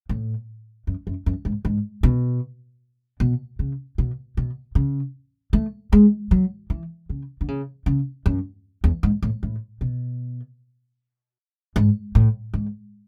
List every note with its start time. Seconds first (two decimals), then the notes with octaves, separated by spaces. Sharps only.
0.09 A2
0.87 F#2
1.07 F#2
1.26 F#2
1.45 G#2
1.65 G#2
2.03 B2
3.20 B2
3.59 C#3
3.98 B2
4.37 B2
4.75 C#3
5.53 A3
5.93 G#3
6.31 F#3
6.70 E3
7.09 C#3
7.41 D3
7.48 C#3
7.86 C#3
8.26 F#2
8.84 E2
9.03 G#2
9.22 A2
9.43 A2
9.81 B2
11.76 G#2
12.15 A2
12.54 G#2